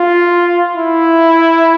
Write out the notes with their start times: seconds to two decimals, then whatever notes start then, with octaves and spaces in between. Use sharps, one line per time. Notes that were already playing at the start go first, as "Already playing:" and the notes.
Already playing: F4
0.76 E4